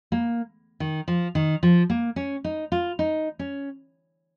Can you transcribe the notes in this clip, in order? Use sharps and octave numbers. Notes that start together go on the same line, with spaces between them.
A#3
D#3
F3
D#3
F3
A#3
C#4
D#4
F4
D#4
C#4